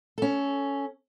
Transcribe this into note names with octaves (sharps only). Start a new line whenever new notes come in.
C#4 A4